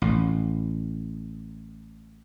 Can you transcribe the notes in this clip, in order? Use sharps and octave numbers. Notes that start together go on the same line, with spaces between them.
A1 A2